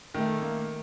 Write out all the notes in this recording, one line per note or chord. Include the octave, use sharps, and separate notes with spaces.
D#3 A3
A#3